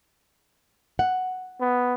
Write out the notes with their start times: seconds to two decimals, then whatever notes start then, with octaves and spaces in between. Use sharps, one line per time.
0.99 F#5
1.61 B3